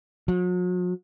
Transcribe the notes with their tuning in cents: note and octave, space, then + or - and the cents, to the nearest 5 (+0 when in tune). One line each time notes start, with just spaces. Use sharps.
F#3 -45